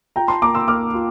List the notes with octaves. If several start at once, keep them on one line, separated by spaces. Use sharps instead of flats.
F4 G5 A#5
A5 C6
A#3 A#5 D6
C6 E6
A#3 D6 F6
F4